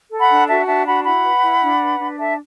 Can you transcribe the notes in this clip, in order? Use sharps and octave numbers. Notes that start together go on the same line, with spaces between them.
A4
F#5 B5
D4
F#4 E5 A5
D4 E5 A5
F#4 F#5 B5
E4 F#5 B5
B4
E4
D4
B4
D4
A4 E5 A5